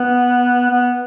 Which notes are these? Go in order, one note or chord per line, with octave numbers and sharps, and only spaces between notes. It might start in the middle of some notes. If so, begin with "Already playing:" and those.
Already playing: B3
B3